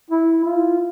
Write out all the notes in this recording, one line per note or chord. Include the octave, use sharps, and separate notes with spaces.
E4
F4